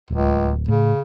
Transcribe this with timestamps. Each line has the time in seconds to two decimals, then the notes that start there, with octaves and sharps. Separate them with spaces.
0.10 D1 C#2
0.68 A2 C#3